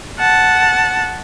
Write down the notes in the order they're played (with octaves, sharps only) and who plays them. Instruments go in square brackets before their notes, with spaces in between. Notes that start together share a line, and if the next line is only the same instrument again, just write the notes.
[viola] F#5 A5